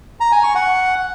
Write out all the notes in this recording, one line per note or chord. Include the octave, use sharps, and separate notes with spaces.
A#5
G#5
C#6
F#5